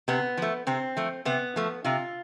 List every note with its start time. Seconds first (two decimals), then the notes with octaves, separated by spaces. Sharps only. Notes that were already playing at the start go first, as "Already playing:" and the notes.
0.08 C3 B3
0.37 F3 A3
0.67 C3 C4
0.97 F3 A3
1.25 C3 B3
1.56 F3 A3
1.84 C3 F4